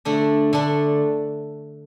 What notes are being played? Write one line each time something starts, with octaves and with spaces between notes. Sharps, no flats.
D3 A3 D4
D3 A3 D4